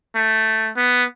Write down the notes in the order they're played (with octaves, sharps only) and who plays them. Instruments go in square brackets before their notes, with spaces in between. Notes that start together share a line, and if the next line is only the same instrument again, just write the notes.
[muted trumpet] A3
B3